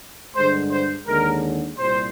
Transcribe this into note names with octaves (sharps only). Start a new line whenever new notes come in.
G2 D3 G#3 C5
C5
D#2 D3 G#3 A#4
C2 A#2 G3 C5